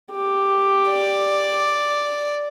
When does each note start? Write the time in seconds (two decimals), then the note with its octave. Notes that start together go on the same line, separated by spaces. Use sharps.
0.12 G4
0.89 D5